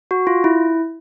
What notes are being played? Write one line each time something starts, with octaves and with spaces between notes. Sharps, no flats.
F#4
F4
E4